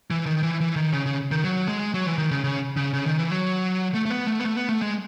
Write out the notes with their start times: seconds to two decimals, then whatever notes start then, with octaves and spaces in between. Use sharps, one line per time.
0.10 E3
0.26 D#3
0.43 E3
0.61 E3
0.76 D#3
0.93 C#3
1.06 C#3
1.31 D#3
1.44 F#3
1.68 G#3
1.94 F#3
2.06 E3
2.18 D#3
2.31 C#3
2.44 C#3
2.77 C#3
2.93 C#3
3.06 D#3
3.18 E3
3.31 F#3
3.94 A3
4.05 A3
4.10 B3
4.27 A3
4.39 B3
4.44 A3
4.56 B3
4.69 A3
4.82 G#3